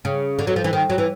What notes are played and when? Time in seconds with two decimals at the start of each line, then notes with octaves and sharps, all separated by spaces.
0.05 C#3
0.39 D3
0.47 F#3
0.56 F3
0.64 E3
0.73 D#3
0.90 F#3
0.98 E3